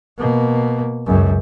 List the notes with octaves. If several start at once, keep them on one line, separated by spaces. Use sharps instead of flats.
B2 A#3
C#2 F#2